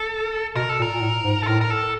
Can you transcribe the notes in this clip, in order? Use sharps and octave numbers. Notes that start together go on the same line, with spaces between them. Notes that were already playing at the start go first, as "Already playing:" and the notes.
Already playing: A4
B2 A#4
A4
A#2
A#4
A#2
A2
G#2
A4
A2 A#4
A#4
A4